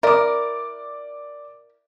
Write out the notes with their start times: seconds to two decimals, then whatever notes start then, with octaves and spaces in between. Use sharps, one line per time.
0.03 E4 A#4 D5 D6